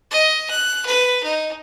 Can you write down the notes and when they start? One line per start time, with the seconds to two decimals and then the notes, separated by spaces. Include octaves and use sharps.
0.11 D#5
0.50 F#6
0.86 B4
1.24 D#4